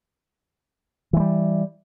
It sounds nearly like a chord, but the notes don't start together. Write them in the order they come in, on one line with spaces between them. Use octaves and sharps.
E3 G#3 G3